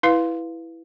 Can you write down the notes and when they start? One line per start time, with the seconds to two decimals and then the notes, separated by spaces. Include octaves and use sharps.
0.03 E4 B4 F5